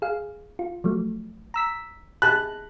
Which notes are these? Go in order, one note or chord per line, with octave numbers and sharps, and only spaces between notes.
G#4 F5
F4
F3 F#3 A3
A#5 E6 B6
G#4 A5 B5 F#6